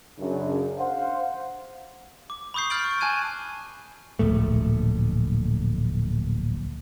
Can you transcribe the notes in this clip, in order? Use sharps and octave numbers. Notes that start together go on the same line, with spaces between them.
F#2 C#3 D4
C5 F5 F#5
D6
B5 C#6 D#6 G6 C7
F6 G6 A6 D7 F#7
C#6
G#5 A5 F#6 G#6 D#7
D1 A#1 A3